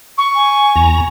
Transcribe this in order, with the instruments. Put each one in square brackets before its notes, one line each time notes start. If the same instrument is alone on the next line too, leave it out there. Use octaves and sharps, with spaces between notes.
[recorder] C#6
[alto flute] G#5
[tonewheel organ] E2 A#5